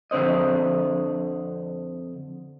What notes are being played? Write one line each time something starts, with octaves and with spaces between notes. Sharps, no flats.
F2 D3 C4 C5 D#5